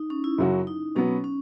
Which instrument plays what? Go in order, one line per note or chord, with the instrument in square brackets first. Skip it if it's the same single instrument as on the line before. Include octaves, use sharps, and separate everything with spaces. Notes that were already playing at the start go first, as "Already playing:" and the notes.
Already playing: [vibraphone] D#4
C#4
E4
[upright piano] F#2 C#3 F#3 C#4 F#4
[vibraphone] D#4
[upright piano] B2 F#3 B3 [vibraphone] C#4
[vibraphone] C#4